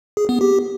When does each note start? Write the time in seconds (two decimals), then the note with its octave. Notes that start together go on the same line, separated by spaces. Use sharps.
0.17 G#4
0.29 B3
0.41 G4